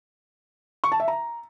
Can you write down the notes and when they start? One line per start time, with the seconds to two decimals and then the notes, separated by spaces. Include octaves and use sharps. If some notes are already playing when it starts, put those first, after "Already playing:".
0.84 C#6
0.92 A5
1.00 E5
1.08 A#5